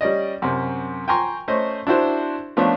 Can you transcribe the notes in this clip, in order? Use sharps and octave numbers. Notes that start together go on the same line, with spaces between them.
G3 C#4 D5 D#5
F#2 C3
G5 G#5 A#5 C6 C#6
A3 C#4 C5 D#5
D4 E4 F#4 C5
F3 A3 B3 C#4 D4 F4